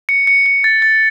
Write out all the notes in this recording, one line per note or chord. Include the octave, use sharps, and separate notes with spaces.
C#7
C#7
C#7
A6
A6